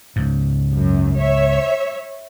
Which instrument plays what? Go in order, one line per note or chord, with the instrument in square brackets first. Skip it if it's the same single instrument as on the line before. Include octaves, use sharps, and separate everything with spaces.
[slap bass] C#2 G#2
[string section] F#2
C#5 E5